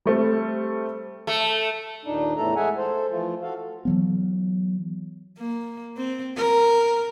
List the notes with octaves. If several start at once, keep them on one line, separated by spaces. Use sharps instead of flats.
G3 A3 C4
A3
D#2 A#2 D4 D#4
E2 A2 E3 A3 A4 A#5
G#3 A3 G#4 E5 F#5 G#5
A4 C5
E3 F3 A3 F4
F#4 A4 F5
E3 F#3 B3
A#3
C4
A#4